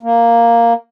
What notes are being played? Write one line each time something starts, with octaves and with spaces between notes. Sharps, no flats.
A#3